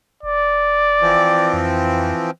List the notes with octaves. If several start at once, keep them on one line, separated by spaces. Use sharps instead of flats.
F1 D5
E3 F3 C4
F2